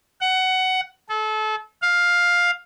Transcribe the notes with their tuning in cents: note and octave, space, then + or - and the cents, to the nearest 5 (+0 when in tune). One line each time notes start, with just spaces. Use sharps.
F#5 +15
A4 -30
F5 +10